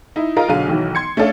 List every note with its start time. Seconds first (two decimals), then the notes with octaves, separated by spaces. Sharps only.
0.16 D#4 E4
0.36 F4 G#4 A#4 D#5 F5 A#5
0.49 B1 D3 F#3 G#4 F5 D#7
0.68 B1 D#3 E3 F#3
0.95 C6 G#6 C#7
1.17 A3 C#4 D4 A4 D5 F5